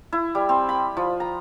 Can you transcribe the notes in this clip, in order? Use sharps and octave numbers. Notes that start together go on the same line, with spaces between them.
E4
G3
C4
B5
F3
A#5